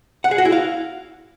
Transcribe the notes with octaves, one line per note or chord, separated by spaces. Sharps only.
F#5
G#4
F#4
E4
F5